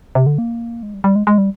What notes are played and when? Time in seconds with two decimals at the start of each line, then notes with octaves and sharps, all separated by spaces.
0.15 C3
0.26 D3
0.38 A#3
0.83 G#3
0.94 G3
1.04 G3
1.16 G#3
1.27 G#3
1.38 G3